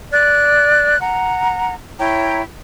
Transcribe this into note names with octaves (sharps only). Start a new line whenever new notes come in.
D5 F#6
F#5 A#5
E4 C#5 G5 A#5